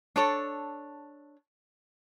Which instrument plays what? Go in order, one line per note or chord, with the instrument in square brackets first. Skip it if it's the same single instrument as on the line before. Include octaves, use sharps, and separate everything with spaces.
[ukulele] D4 A4 C#5